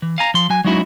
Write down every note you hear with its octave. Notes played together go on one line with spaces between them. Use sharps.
E3
F5 G#5 A#5
F3 C6
F#3 G#5
F#3 G#3 C#4 D#4 E4 F#4